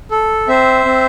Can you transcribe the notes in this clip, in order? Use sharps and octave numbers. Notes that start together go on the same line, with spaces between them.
A4
C4 C5 E5
C4